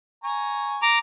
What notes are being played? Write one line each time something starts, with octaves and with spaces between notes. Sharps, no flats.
G#5 A#5 C#6
A#5 D6